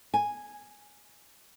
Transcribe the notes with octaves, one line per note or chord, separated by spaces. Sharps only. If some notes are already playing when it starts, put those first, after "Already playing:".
G#5